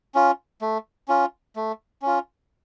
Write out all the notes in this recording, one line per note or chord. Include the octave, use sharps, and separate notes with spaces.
C#4 F4
A3
C#4 F4
A3
C#4 F4